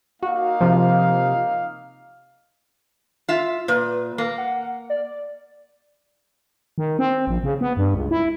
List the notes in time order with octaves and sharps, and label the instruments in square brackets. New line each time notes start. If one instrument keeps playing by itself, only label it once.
[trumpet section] A#3 D#4 F5 [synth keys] F#4
[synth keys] C3 F3
[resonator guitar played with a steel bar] F4 E5
[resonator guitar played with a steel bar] A#2 [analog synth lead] B4
[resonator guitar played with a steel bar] A#3
[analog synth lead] F#5
D5
[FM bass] D#3
C4
A#1
C#3
B3
G2
C#2
E4